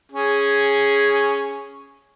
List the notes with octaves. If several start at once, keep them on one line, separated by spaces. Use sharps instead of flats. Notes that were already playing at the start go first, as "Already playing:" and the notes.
C#4 G#4